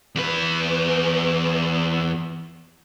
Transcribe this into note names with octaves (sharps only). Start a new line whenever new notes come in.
E2 B4